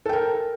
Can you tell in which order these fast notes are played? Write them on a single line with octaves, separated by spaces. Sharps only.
A4 G5 A#4